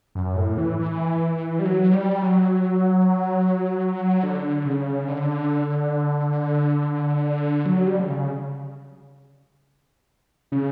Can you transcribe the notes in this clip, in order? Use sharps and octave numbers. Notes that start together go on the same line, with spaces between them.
F#2
A2
E3
E3
G3
F#3
G3
F#3
D3
C#3
D3
F#3
G3
D3
C#3
C#3